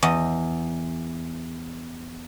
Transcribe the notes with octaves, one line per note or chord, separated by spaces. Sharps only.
E2 D#5